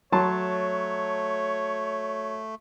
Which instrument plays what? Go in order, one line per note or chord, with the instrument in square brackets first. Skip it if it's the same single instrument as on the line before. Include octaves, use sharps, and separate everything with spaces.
[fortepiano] F#3 A5 C6 [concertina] A3 [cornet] C#5